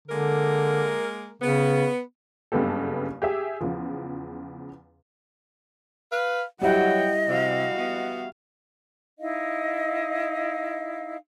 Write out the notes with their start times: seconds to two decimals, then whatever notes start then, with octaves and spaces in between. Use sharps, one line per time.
0.08 D3 G#3 A#3 A#4
1.42 C#3 B3
2.52 F#1 G2 C#3 B3 G4 A4
3.22 G4 G#4 E5
3.61 E2 C#3 F3
6.12 B4 F5
6.61 F#3 G3 E4 D#5 F#5 G5
7.29 C3 F#4 F5
7.78 B3
9.19 D#4 E4 D#5 F5